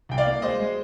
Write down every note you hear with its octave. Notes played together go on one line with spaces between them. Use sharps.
C2 G5
D5 F5
A#3
G#3 C5 D#5
G#3